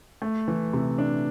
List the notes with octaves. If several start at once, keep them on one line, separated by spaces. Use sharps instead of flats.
A3
E3
C3
D4